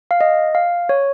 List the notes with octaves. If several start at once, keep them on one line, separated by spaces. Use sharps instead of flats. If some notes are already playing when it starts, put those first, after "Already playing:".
F5
D#5
F5
C#5